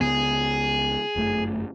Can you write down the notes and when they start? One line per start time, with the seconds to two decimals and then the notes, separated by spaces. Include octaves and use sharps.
0.01 C#2 C#3 B3 G#4
1.16 G1 F#2 A3